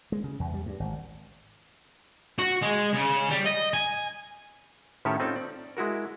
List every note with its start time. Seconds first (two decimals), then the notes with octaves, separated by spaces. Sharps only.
0.12 G#3
0.24 C#3
0.40 E2
0.54 G3
0.66 G2
0.80 G#1
2.39 F#4
2.62 G#3
2.93 C#3
3.30 G3
3.46 D#5
3.74 G#5
5.05 A2 D#3 C#4 G4 A4 C#5
5.20 C4 C#4 D#4 F4 A4
5.36 D5
5.77 G#3 E4 F#4 A#4